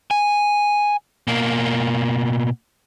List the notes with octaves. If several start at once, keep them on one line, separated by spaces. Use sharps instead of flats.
G#5
B2 A#3